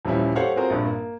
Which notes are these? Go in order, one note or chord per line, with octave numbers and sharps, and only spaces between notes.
D#1 E3 F3 G3 C#4 E4
G4 A4 C5 C#5 F5 F#5
C4 F4 F#4 G#4 A#4 C5
A#1 G2
A#3